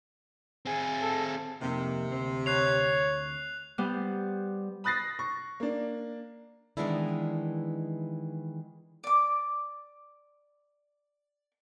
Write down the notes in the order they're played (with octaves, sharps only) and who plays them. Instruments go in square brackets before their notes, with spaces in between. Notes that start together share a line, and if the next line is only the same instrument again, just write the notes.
[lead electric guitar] C4 G#4
[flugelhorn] A4
[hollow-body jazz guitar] F2 A#3 D#4 [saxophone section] C3
[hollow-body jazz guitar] D2 C4 C5
[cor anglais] C#5 [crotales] F#6 C7 F7
[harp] G3 B3 C5
[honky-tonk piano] B5 D#6 F#6 A6 A#6 C7
C#6
A#3 D4
[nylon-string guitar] D#3 E3 G#3 B3 D4 E4
[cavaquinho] D5 D6